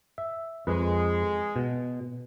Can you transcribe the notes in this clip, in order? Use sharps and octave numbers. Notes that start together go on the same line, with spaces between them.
E5
F2 G#3 B4
B2